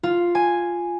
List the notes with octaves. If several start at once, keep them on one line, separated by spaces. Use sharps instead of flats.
F4
G#5